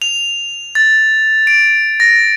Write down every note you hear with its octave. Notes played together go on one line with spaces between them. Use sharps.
F7
A6
D7
A#6